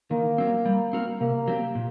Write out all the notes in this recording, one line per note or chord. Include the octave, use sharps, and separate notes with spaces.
D#3 A#3
F#3 C4
G3
C4 F#4 A#4
C3 A#3
F#3 C4 G4
A#2